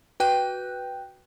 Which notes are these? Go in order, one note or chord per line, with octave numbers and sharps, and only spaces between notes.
F#4 B4 G5 F#6 G6